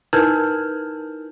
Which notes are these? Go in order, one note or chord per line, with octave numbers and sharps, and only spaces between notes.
D#4 E4 A#4 B4 F6 G6